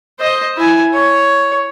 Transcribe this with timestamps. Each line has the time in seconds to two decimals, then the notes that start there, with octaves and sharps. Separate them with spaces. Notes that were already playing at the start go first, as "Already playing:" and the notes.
0.20 C5 D#5
0.57 E4 G#5
0.94 C#5